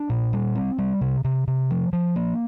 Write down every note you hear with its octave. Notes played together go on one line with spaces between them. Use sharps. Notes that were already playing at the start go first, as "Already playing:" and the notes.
Already playing: D4
A#2
G3
C4
G3
C3
C3
C3
F3
F3
A#3